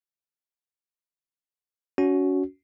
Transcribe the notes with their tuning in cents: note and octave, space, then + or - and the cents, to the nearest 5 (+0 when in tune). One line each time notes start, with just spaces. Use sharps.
C#4 +25 F#4 +0